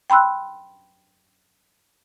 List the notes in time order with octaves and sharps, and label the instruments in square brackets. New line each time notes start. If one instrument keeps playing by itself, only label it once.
[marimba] G5 B5 C6 E6 F#6